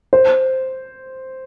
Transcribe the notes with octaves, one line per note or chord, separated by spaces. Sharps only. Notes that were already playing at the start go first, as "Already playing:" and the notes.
C5